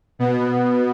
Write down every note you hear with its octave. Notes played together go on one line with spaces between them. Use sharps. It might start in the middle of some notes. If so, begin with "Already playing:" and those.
B2 B3